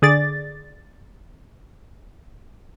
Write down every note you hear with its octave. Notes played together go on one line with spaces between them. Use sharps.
D3 G#4 D5 A6